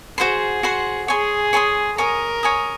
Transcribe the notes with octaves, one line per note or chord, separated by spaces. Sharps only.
F#4 G#4 C5 F#5 C6
F#4 C5 F#5 C6
G#4 C#5 G#5 C6 D#6
C#5 G#5 C6 D#6
A#4 C#5 G#5 D#6
C#5 G#5 D#6